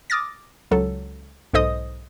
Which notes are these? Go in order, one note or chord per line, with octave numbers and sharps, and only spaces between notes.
D6 D#6 F6 A6 A#6
C#2 F#3 A4
B1 G#2 A4 C5 D#5 D#6